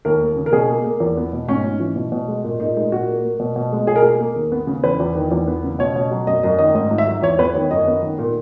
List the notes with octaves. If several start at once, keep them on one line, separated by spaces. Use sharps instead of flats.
D#2 A#4
A#3
C#3
A#4
B2 G#4
A#3
A#3
E2
B3
B2
G#2 C#4
G#2
E3
B2
B2
G#3
A#2
A#2 D#4
G#3 D#4
A#2 F#4
A#3
A#3
B2
B2
G#3
B2 G#4
A#4
A#3 G#4
A#3
D#2
B3
C#3
E2 B4
E2
D#3
E2
B3
C#3
B2 C#5
B2
F#3
F#2 D#5
F#2 D#5
D#3 D#5
G#2 D#5
G#2
E5
F#3
E2 C#5
B3 B4
D#3 C#5
F#2 D#5
B3
D#3
A#2